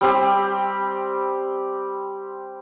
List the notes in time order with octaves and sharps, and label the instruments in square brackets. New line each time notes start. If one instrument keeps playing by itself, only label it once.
[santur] G3 C4 G4